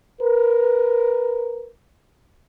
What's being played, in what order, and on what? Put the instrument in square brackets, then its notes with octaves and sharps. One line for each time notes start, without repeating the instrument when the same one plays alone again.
[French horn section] A#4 B4